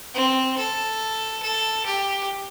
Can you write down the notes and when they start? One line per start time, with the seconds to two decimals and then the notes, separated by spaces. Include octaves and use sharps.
0.14 C4
0.58 A4
1.43 A4
1.86 G4